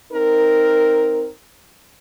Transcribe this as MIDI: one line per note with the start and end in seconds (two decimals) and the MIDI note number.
0.13 1.30 60
0.13 1.30 63
0.13 1.30 70